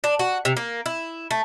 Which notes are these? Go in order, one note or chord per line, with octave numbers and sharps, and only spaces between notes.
D4
F#4
C3
A#3
E4
A3